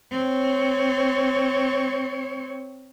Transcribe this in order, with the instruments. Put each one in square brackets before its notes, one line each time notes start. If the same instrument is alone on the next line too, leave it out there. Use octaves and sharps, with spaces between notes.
[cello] C4 C#5